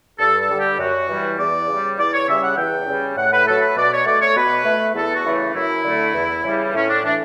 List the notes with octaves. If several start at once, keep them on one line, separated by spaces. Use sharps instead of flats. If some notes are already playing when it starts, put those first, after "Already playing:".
G2 A4
A4
D3 G3
G4
F#2 F#4
E3 G3
E2 D5
C#3 G3
E2 D5
C#5
C#3 G3 E5
F#5
E2 G5
C#3 G3
A2 F#5
B4
F#3 A3 A4
B4
B2 D5
C#5
A3 D5
C#5
B2 B4
A3
E2 A4
F#4
C#3 E3 A3
F#2 E4
D3 A3
E2
C#3 E3 G3
A2 C#4
D4
E3 A3 D4